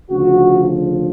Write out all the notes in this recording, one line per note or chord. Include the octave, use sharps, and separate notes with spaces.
D2 C#3 F3 F#4